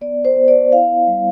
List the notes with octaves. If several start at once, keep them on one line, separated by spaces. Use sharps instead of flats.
B3 D5
C5
B3
D5
E4 F5
G3